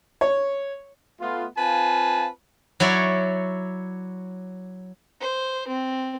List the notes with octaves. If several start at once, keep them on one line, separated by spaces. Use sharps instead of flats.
C#5
A3 B3 F4
C4 F4 B4 F5 G#5 A5
F#3 E4 C#5 D5
C5
C4